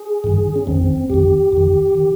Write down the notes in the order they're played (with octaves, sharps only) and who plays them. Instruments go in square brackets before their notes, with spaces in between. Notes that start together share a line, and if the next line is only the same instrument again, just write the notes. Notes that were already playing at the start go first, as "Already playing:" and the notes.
Already playing: [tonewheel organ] G#4
G2 D#3
C#4
F2 D#3 C4
F2 D#3 G4
F2 D#3
D#3